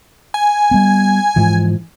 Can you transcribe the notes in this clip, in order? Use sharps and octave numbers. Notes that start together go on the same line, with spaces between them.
G#5
G3 B3
G#2 E3 F3